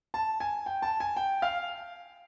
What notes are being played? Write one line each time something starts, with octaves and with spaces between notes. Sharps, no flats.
A5
G#5
G5
A5
G#5
G5
F5